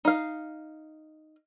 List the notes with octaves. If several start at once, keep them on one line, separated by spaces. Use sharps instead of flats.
D#4 F5